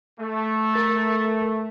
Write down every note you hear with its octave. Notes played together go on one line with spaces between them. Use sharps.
A3
A#4 A6